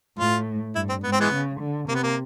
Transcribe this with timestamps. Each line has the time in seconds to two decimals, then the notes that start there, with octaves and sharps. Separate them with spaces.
0.19 A2 F4
0.76 G2 E4
0.89 C4
1.03 G#2 B3
1.12 C4
1.20 E3 G#3 B3
1.32 C#3
1.60 D3
1.89 C3 A#3
1.95 B3
2.03 A#3